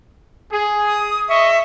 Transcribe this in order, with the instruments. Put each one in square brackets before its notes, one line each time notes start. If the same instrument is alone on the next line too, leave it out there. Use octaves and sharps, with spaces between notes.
[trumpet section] G#4
[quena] D#6
[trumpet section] D#5 C#6 [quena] E5